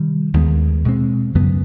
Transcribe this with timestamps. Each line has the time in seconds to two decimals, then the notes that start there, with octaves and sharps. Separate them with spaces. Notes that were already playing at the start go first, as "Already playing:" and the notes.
Already playing: C3 D#3 G3
0.34 D#2 D#3 G#3 B3
0.85 B2 G#3 C4
1.35 F#2 C#3 F#3 B3